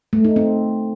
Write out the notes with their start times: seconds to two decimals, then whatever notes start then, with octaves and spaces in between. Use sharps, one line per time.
0.13 A3
0.25 D#4
0.36 C4